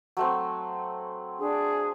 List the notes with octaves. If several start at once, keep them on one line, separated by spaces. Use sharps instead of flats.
F#3 A3 C4
D4 G#4